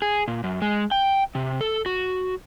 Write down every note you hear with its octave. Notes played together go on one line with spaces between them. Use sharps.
G#4
A#2
F#2
G#3
G5
C3
A4
F#4